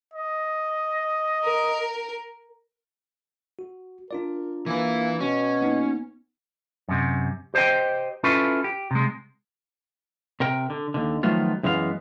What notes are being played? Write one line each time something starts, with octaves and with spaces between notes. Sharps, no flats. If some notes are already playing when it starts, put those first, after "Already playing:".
D#5
A#4
F#4
D4 F4 A#4 D5
E3 A#3 B4
B2 C#4
A#3 B3 D#4
F#2 C3
G4 C5 D5 D#5 G5
C#4 E4 F4 A4 B4
G4
C3 G#3
C3 A#4 G5
D3
D#2 D3
D#3 F3 F#3 A3 B3 F4
F#2 E3 G#3 B3 F5